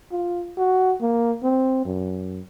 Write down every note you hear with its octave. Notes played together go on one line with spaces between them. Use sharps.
F4
F#4
A#3
C4
F#2